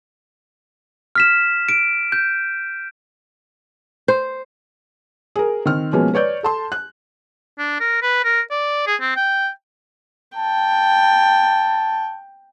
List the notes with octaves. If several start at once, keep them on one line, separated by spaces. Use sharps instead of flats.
F6 B6 E7
D7
G6
C5
G#4 A#4
D#3 C4 F6
B2 F3 G#3 A#3 B3 C#4
B4 C#5 D5 G6
A4 A5 C6
F#6
D4
A#4
B4
A#4
D5
G#4
C4
G5
G5 A5